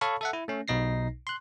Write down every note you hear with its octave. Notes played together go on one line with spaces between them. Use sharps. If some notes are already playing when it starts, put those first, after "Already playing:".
A4 C#5 F5 A5 B5 C#6
A4 E5 F#5
E4
A3 C#4
B1 B2 D#4 A#6 C7
C6 F#6